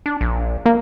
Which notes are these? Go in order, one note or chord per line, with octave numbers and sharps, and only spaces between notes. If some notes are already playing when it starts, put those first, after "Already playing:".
D4
A#1
A#3